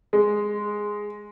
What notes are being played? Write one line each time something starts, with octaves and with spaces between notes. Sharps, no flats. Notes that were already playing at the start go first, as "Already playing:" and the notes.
G#3